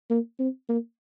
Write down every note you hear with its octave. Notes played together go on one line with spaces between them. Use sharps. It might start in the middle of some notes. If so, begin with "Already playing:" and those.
A#3
C4
A#3